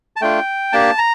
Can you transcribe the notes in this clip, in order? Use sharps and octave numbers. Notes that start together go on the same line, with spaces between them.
A5
A3 D4 F4 G5
A#3 D4 G4 A5
A#5